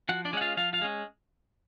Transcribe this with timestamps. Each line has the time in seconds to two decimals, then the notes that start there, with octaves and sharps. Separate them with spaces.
0.09 F3 F#4 F#5
0.25 D4 D5
0.33 G#3 C#4 F#5
0.41 F4 F5
0.57 F3 F4 F5
0.73 F4 F5
0.81 G#3 C#4